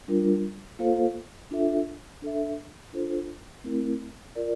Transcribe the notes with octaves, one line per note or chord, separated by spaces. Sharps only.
G3 D4 F4 A#4
A#3 F4 A4 C5 F5
D4 F4 A4 E5
D4 A4 E5
D4 F4 A4 C5
A3 C4 E4 A#4
F4 A#4 D5